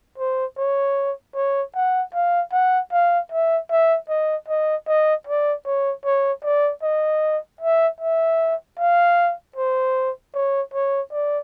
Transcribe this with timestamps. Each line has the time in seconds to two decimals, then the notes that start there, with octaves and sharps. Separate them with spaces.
0.18 C5
0.57 C#5
1.35 C#5
1.75 F#5
2.14 F5
2.52 F#5
2.92 F5
3.32 E5
3.70 E5
4.09 D#5
4.48 D#5
4.87 D#5
5.27 D5
5.66 C#5
6.05 C#5
6.44 D5
6.83 D#5
7.61 E5
8.01 E5
8.79 F5
9.56 C5
10.34 C#5
10.74 C#5
11.12 D5